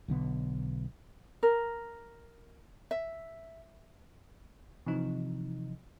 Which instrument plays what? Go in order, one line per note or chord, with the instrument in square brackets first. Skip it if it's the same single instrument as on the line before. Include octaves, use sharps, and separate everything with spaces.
[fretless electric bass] B1 D3 B3
[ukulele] A#4
E5
[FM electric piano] C3 E3 F3 D#4